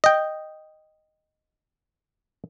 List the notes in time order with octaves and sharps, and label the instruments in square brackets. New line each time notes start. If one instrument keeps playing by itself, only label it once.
[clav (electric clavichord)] D#5 G5